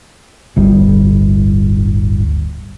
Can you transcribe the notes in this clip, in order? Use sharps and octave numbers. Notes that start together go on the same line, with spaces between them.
D1 G1 G3